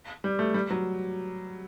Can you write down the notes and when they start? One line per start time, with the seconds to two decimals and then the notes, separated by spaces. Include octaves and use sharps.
0.24 G3
0.39 A3
0.54 G3
0.71 F#3